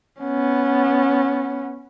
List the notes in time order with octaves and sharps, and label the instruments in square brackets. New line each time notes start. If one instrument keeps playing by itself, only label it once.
[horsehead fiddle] B3 C#4